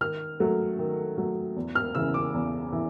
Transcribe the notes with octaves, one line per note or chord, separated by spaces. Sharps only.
D#3 F6
F#3 A3
D#3
F#3 A3
E2
F6
C#3 E3 E6
D6
E2
E3